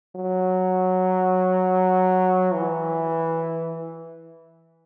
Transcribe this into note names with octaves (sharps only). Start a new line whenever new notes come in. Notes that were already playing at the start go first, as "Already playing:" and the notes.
F#3
E3